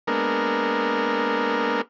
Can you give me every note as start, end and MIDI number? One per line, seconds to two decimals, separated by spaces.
0.07 1.81 56
0.07 1.81 58
0.07 1.81 59
0.07 1.81 62
0.07 1.81 70